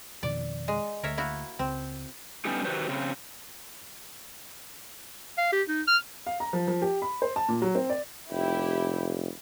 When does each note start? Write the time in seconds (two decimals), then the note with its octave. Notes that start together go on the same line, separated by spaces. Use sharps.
0.23 F2 B2 D#3 D5
0.68 G#3
1.03 D2 A#4 C#5 E5
1.18 A#3 E4 F#4
1.59 C#2 C4
2.45 G3 B3 C#4 D#4 G4
2.65 D#3 F#3 F#4 G4 B4 C5
2.89 C#3 C4
5.38 F5
5.52 G4
5.68 D#4
5.87 F6
6.26 F5
6.40 A#5
6.53 F3
6.68 F3
6.82 G4
7.02 B5
7.22 C5
7.36 A5
7.49 A#2
7.62 F#3
7.75 C4
7.90 D5
8.30 F1 E4 G4